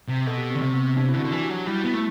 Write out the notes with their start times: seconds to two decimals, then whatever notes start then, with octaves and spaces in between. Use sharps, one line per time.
0.09 C3
0.27 B2 A4
0.38 G4
0.50 C4
0.55 D3
0.62 C3 C4
0.74 B3
0.84 C4
0.97 C3 D4
1.09 E4
1.14 D3
1.20 F#4
1.25 D3
1.31 E3 D4
1.44 G4
1.49 F#3 F#4
1.67 G3 E4
1.84 B3 E4
1.94 A3